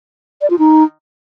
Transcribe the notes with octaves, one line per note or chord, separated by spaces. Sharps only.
D5
F4
D#4